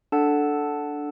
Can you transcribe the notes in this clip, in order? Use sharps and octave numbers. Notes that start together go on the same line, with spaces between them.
D4 A4 F#5 A5